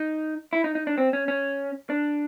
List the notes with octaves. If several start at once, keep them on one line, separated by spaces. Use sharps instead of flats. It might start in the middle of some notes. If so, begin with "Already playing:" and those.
Already playing: D#4
E4
D#4
D#4
D4
C4
C#4
C#4
D4